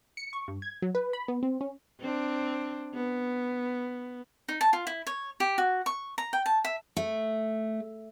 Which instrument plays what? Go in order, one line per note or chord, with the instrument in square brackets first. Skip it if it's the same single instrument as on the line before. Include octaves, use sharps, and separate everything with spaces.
[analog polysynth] C#7
C#6
G2
G#6
F#3
B4
B5
B3
C4
C#4
[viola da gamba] C4 D4
B3
[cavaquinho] D#4
A5
F4
E4
C#5
G4
F#4
C#6
A#5
G5
A5
E5
[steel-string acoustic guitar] A3